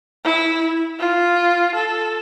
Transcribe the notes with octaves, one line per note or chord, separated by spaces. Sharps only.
E4
F4
A4